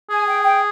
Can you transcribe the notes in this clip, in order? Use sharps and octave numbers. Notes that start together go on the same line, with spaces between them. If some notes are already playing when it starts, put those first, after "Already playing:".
G#4 G#5
G5
G5